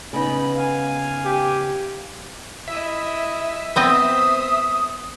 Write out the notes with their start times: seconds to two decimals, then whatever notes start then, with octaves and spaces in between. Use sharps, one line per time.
0.13 C#3 B3 D#4 B5
0.56 F5 G#5
1.25 G4
2.68 E4 D#5 E5
3.76 B3 C4 C5 D#5 D#6